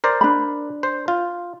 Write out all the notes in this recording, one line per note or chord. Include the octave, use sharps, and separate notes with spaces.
A#4 C5 D5
D4 B5
C5
F4